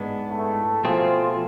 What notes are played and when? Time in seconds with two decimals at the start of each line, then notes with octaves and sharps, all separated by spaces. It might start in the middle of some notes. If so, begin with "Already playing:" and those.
Already playing: G#2 G#3 B3 D4
0.29 A2 A3
0.84 B2 F3 A3 C4 F4 G#4